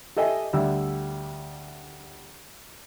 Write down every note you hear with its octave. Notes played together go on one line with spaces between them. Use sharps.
G4 A4 D#5 E5 G#5
D2 G3 E5 E6